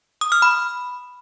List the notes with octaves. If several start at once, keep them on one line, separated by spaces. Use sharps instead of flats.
D#6
F6
B5